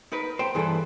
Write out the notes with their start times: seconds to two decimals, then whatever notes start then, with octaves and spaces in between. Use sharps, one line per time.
0.12 D#4 A#4 B4
0.39 C5 G5 A#5
0.55 G2 E3 G#4 A4 B4